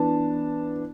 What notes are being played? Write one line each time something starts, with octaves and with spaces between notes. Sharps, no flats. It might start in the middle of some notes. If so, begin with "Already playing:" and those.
Already playing: E3 B3 D4 A5